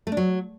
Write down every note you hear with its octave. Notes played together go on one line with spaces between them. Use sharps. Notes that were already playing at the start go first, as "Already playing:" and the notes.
A3
D4
F#3